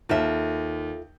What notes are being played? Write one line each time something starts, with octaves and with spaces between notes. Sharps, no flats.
D#2 F4 A4 E5